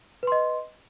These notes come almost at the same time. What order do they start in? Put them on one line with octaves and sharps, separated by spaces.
B4 C6 D#5